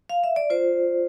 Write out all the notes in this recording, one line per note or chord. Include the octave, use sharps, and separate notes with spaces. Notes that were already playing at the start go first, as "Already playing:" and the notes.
F5
E5
D5
F4 C5